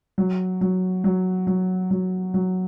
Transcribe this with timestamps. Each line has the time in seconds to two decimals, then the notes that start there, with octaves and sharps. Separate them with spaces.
0.18 F#3
0.61 F#3
1.04 F#3
1.47 F#3
1.91 F#3
2.34 F#3